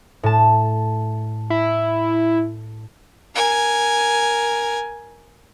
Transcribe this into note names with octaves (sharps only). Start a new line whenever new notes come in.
A2 A5
E4
A#4 G#5